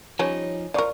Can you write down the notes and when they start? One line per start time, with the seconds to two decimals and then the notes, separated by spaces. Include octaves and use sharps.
0.19 F3 G3 C#4 D#4 C#5 G#5
0.74 F3 A#4 D5 C#6